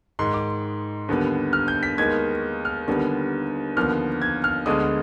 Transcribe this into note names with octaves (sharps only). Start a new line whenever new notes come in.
G#2 D#3 G#3 C6
D6
D#2 D3 G3 B3
F6
G6
B6
D#2 D#3 G#3 B3 G#6
F6
D#2 D3 G3 B3
D#2 D3 F3 B3 F6
G#6
F6
D2 D3 G#3 B3 D#6